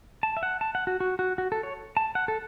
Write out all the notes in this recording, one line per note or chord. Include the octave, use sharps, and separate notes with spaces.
A5
E5
F#5
A5
F#5
F#4
F#4
F#4
F#4
A4
C#5
A5
F#5
A4